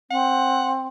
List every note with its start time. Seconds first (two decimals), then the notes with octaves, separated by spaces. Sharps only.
0.10 C4 F#5